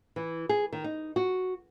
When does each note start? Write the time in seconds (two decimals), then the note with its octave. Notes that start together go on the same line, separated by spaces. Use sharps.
0.16 E3
0.49 G#4
0.73 D#3
0.84 D#4
1.16 F#4